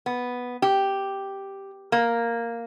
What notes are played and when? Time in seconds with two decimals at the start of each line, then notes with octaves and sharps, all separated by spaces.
0.06 B3
0.62 G4
1.92 A#3